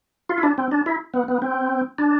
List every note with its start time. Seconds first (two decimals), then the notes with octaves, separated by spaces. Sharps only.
0.29 F4
0.38 E4
0.43 D4
0.58 C4
0.71 D4
0.86 E4
1.14 B3
1.28 B3
1.42 C4
1.98 D4